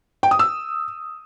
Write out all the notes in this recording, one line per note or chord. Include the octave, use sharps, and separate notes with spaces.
G5
D#6
E6